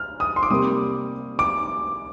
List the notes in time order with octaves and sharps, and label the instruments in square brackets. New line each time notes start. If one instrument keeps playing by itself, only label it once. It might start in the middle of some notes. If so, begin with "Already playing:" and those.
Already playing: [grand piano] F6
D#6
C6
D6
C3 G3 A#3 D#6
D6